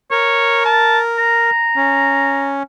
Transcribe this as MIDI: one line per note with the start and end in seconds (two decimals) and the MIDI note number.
0.11 1.50 70
0.11 0.63 73
0.65 0.99 81
1.19 2.56 82
1.76 2.63 61